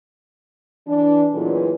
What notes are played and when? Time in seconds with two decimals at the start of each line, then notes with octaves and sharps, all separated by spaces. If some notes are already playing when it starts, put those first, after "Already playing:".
0.88 E3 D4
1.34 A#2 E3 F#3 G#3 B3 A4